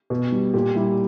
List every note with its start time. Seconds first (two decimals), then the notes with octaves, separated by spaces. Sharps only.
0.10 B2
0.32 G3
0.54 A#2 G4
0.75 G3 E4